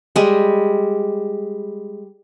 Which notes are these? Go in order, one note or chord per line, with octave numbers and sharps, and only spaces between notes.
G3 G#3